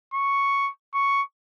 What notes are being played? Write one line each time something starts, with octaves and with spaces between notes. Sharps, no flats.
C#6
C#6